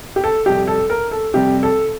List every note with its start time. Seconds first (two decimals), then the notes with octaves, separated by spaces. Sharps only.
0.16 G4
0.24 A4
0.46 F2 C3 G3 G4
0.68 A4
0.90 A#4
1.11 A4
1.34 F2 C3 G3 G4
1.63 A4